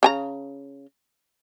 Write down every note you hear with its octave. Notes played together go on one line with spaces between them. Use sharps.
C#3 G#5 A#5